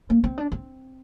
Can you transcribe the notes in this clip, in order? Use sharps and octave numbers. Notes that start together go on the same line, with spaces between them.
A#3
C4
D4
C4